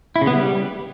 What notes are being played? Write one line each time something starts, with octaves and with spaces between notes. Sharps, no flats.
E4
C#3
B3
G3